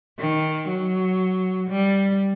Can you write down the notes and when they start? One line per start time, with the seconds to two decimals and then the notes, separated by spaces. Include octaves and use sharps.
0.19 D#3
0.69 F#3
1.70 G3